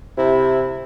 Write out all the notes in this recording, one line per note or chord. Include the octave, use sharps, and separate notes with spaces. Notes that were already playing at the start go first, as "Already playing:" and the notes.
C3 E4